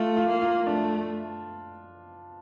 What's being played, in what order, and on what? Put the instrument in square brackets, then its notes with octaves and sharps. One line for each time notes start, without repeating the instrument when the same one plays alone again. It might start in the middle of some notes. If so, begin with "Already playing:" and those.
Already playing: [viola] A3 [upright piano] F4
[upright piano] F4
[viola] A#3
[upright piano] F4
[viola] A3 [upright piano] D4